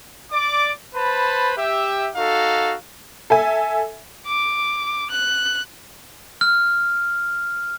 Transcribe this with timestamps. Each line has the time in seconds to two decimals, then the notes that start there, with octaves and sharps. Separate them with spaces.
0.32 D5 D6
0.94 B4 C5 A5 B5
1.57 G4 E5
2.16 D#4 F#4 A4 F5
3.30 A4 E5 G#5
4.27 D6
5.11 F#6
6.41 F6